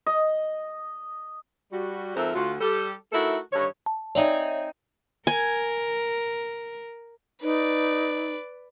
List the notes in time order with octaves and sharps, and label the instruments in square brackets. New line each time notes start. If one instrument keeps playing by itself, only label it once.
[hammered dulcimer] D#5
[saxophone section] G3 F#4
F2 G#2 F3 A#4 C5 E5
D2 F4 F#4
G3 G4 A4
A3 D#4 E4 F#4 A4 A#4
G2 D3 D#3 C#5
[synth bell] A5
[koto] C4 D#4 G#5 [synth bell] C#5 D5 E5
[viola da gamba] A#4 [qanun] G#5
[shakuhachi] D#4 [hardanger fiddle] B4 D5